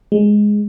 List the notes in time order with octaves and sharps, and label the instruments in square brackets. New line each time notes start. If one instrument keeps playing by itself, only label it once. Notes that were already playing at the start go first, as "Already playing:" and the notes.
[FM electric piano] G#3